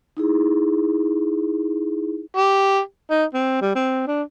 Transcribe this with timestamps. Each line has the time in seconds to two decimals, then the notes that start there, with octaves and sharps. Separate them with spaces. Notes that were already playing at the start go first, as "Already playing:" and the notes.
0.17 D#4 E4 G#4
2.36 G4
3.10 D#4
3.34 C4
3.62 G3
3.75 C4
4.07 D4